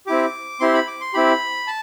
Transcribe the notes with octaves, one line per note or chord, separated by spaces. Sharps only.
C4 E4 G4 D6
C4 E4 G4 C6
B5
D6
C6
C4 E4 G4 B5
A5